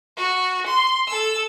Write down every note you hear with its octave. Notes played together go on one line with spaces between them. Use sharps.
F#4
C6
A4 E6